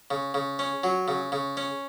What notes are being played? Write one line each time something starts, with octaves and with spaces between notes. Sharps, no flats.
C#3
C#3
C#4
F#3
C#3
C#3
C#4